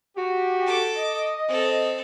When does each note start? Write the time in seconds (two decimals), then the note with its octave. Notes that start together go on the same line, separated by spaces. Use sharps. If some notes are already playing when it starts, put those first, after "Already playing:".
0.17 F#4 G4
0.66 A4 D6
0.97 D#5
1.48 C4 A4